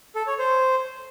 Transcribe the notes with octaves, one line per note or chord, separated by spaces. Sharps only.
A4
C#5
C5